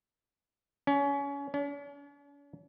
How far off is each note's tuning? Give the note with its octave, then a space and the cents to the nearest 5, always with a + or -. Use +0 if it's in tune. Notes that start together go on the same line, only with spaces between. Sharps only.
C#4 +25
C#4 +45